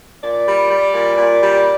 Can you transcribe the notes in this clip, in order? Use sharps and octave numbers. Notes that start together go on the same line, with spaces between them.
A#2 D5
G3
G3
A#2
A#2
G3